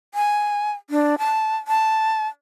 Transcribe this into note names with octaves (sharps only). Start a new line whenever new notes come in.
G#5
D4
A5
A5